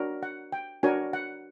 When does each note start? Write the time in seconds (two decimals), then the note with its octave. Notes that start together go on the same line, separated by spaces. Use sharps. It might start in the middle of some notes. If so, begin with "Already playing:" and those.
Already playing: D4 F#4 A#4 C#5
0.23 F#5
0.52 G5
0.83 D4 F#4 A#4 C#5 G#5
1.13 F#5